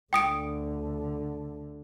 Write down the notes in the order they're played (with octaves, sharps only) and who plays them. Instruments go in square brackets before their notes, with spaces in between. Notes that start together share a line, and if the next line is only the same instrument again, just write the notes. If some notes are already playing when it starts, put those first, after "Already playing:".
[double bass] D2 D3 [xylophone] G5 D#6 D7